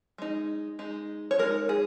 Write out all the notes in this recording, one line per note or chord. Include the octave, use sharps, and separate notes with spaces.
G#3 D#4
G#3 D#4
C#5
G#3 D#4 A#4
G#4